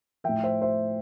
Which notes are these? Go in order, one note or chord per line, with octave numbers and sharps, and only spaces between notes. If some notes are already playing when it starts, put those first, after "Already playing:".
A2 F3 E5 G5
C5 E5
C5 E5